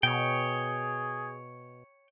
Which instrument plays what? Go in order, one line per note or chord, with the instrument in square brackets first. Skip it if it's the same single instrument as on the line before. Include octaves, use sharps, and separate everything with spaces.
[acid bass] B2 [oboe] G#4 [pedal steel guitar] C#5 G5